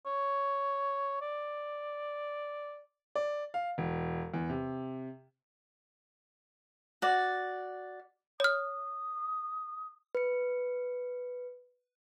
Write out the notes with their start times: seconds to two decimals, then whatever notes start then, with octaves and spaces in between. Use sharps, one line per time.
0.06 C#5
1.21 D5
3.15 D5
3.54 F5
3.78 E1
4.34 E2
4.50 C3
7.02 F#4 D5
8.40 C#5 D#6 F6
10.15 B4 C#7